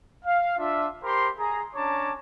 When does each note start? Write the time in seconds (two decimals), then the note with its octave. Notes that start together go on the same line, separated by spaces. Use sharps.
0.25 F5
0.58 D4 F4 E5
1.03 G4 A#4 C5 B5 C6
1.37 G#4 A#5
1.75 C#4 D4 C#5 A5 A#5 D6